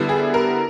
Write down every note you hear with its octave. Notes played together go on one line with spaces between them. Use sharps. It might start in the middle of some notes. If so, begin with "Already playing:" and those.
Already playing: D3 G3 B3 E4
G#4
A#4